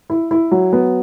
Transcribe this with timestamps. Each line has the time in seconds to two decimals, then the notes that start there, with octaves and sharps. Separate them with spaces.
0.10 E4
0.31 E4
0.51 F#3
0.73 B3